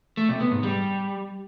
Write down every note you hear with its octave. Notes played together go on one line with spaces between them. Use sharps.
A3
C3
B3
G#2
G3